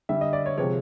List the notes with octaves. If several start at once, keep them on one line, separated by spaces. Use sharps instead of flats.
D3 G3 E5
D#5
D5
C#5
C3 F3 G#3 C#5